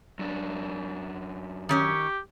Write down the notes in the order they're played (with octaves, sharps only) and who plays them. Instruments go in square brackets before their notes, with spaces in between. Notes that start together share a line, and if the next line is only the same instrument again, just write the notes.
[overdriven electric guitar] F#2 D4
[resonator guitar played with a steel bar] D#3 C#4 C#5 [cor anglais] G4